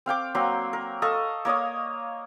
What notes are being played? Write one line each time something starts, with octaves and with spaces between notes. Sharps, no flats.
C4 F5 G5 D6
F#3 A#3 C4 C6
A#4
A4 D#5 F5 C#6
A#3 C#5 D#5 D#6